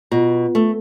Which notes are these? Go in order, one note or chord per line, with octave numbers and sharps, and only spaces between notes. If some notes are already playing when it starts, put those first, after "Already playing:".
B2 F4
A3